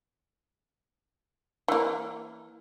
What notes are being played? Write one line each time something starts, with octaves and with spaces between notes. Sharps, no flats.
E3 A#3